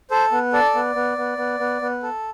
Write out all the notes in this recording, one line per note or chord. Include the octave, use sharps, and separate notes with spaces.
A4 C5
B3
A4 D5
B3
B3
B3
B3
B3
B3
A4